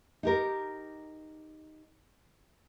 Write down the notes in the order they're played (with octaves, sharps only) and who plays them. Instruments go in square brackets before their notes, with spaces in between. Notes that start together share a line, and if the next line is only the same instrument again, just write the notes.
[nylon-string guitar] D#4 G4 A#4